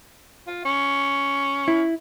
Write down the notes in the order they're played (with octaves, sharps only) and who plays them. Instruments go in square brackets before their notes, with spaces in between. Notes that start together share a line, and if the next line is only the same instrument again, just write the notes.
[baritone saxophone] F4
C#4
[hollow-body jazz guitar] E4